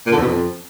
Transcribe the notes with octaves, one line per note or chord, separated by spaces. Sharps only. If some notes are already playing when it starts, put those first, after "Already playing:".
A#2
D3
E2
B2
F2